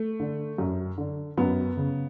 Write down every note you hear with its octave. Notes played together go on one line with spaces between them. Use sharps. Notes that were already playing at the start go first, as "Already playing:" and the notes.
Already playing: A3
D3
F#2
D3
F#2 B3
C#3